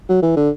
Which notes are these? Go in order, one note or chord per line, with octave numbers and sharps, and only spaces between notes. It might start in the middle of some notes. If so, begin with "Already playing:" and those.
F#3
E3
D3